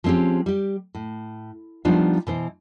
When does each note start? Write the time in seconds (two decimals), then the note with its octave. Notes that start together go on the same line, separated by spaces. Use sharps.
0.04 F3 G#3 C4 C#4 G4
0.46 G3 G4
0.95 A2
1.85 F3 G3 B3 D4 D#4 F4
2.27 B2 E3 C5